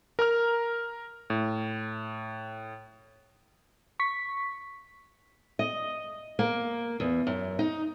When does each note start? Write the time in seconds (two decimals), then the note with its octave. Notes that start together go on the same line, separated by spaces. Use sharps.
0.19 A#4 A#5 F6
1.30 A2
4.00 C#6 B6
5.59 D#5
6.39 A#3
7.00 E2
7.27 F#2
7.59 D#4